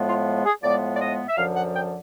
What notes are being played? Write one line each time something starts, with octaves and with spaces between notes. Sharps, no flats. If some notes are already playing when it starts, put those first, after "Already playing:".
Already playing: A2 F3 G#3 B3
F4
G#4
A2 F3 G#3 B3 D5
D5
D#5
E5
F#2 D3 F3 F5
F#5
G5